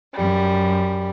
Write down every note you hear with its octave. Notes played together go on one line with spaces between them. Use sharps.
F#2 G3